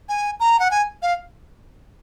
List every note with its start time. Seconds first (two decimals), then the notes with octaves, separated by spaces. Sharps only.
0.09 G#5
0.40 A#5
0.60 F#5
0.71 G#5
1.02 F5